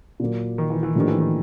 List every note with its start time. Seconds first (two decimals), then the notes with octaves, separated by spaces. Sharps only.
0.20 A#2 F#3 A#3
0.58 D#3
0.70 E3
0.83 E3
0.95 A2 D#3 F3 A#3 D4 G4
1.08 E3
1.20 D#3